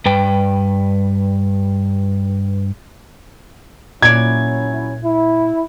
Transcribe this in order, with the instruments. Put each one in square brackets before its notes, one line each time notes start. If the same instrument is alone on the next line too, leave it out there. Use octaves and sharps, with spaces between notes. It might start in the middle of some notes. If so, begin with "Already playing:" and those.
[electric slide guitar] G2 B4 G5
[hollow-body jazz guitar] A#2 D5 [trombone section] F#3 C#4 E4 [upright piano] G#6
[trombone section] E4